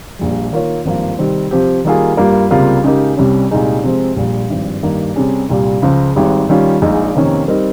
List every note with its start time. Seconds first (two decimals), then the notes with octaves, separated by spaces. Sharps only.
0.19 A#1 A#2 G3
0.52 D#3 A#3 F4 A#4 C#5
0.85 G#1 G2 F3 A#3 F4
1.18 C3 D#3 G3 C4
1.51 C3 F3 C4 G4
1.84 D#3 G3 A#3 F4 G#4
2.17 G2 G3 A#3 F4
2.51 C#2 C3 G3 A#3 F4
2.84 C#3 G#3 D#4 G4 A#4
3.17 C2 C3 G3 C#4
3.51 C2 A#2 G#3 D#4 G#4
3.84 C3 F3 G#3 C4
4.16 A#1 A#2 G3
4.50 G#1 G2 F3
4.83 G2 D#3 A#3
5.16 C3 G3 C#4 G#4
5.49 C2 A#2 G3
5.82 C#2 C#3 F3
6.15 G#1 G#2 G3
6.49 D#3 G3 C#4 F4
6.82 A#1 A#2 G#3 D#4
7.15 F2 C3 D#3 A#3 C#4
7.48 G3 C4 D#4 A#4